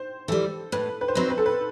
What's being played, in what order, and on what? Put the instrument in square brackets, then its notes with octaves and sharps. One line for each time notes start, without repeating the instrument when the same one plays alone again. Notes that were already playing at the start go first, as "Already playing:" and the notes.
Already playing: [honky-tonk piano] C5
[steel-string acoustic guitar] E3 G3 [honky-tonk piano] A4
[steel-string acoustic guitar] A2 [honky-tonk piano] B4
[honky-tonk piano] B4
C5
[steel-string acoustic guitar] F#3 C4 D#4 [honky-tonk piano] B4
[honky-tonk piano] B4
A4
B4